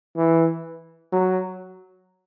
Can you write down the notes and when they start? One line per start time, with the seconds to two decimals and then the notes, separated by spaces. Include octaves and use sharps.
0.16 E3
1.12 F#3